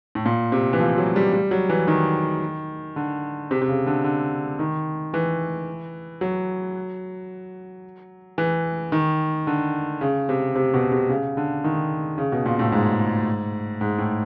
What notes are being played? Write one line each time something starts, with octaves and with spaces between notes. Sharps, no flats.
A2
A#2
C3
E3
F3
F#3
G3
G3
F#3
E3
D#3
D3
C3
C3
C#3
D3
D3
D#3
E3
F#3
E3
D#3
D3
C#3
C3
C3
B2
C3
C#3
D3
D#3
C#3
B2
A#2
A2
G#2
G#2
A2